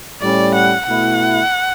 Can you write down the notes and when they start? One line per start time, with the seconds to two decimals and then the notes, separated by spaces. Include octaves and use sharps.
0.21 A2 G3 C#4 D5
0.55 F#5
0.88 B2 A3 E4 F#5